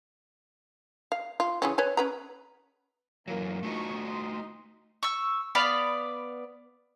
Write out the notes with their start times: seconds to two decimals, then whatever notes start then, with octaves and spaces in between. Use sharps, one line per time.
1.12 F5
1.40 F4
1.62 C#3 E3 C#4
1.78 B4 C#5 G#5
1.97 C#4 B4 A#5
3.28 F#2 E3 F#3 A#3
3.63 A3 D4 D#4 F4 F#4 C#6
4.03 D#4 C6
5.03 C#6 E6
5.55 B3 D5 F5 B5